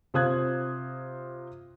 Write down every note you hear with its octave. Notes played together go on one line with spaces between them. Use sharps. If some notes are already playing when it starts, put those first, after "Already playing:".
C3 F4 C5 D#6 F#6 G#6